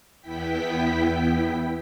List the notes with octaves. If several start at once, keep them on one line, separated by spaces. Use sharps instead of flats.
E2 B3 E4 G5 B6